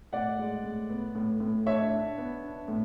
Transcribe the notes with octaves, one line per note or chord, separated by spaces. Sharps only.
A2 D5 F#5
G#3
A2
B3
A2
A2
D4 C#5 E5
D4
B3
D4
A2